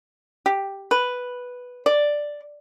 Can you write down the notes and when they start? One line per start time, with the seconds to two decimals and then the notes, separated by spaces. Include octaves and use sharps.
0.46 G4
0.91 B4
1.86 D5